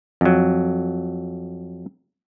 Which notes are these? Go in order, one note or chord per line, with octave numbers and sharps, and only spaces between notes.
F2 F#3